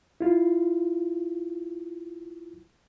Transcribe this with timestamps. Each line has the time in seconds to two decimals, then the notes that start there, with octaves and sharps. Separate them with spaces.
0.20 E4 F4